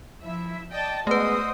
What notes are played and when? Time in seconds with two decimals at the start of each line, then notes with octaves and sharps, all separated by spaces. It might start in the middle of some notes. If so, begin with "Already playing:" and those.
0.23 F3 E4 E5
0.71 D5 D#5 G5 A5
1.07 G#3 A3 B3 F#4 B4 C5 D#5 D#6